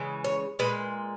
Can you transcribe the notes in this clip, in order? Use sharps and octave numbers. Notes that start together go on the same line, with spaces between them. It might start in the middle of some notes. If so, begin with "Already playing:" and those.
Already playing: C#3 E3 G#3
C#5
A#2 G#3 B4